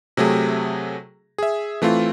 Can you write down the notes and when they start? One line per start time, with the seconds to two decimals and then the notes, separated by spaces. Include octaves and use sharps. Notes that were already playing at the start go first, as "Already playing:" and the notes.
0.17 C3 F#3 A3 G#4
1.38 G#4 E5
1.82 E3 A3 C4 F4